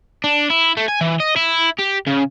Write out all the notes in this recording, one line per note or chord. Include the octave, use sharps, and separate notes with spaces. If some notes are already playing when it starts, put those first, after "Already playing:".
D4
E4
A3
G#5
E3
D#5
E4
G4
C#3